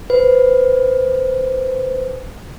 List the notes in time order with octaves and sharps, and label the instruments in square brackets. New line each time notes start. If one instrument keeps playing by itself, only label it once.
[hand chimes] B4 [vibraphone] C5